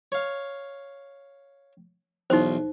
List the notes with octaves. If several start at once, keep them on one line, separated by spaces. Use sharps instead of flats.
C#5 F5
B1 E2 D#4 C5 C6